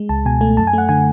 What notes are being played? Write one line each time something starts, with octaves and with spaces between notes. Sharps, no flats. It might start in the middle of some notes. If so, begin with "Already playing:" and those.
Already playing: G#3
C#2 A5
B2 G#5
A3 G#5
F#2 A5
G#5
A3 F#5
D3 G#5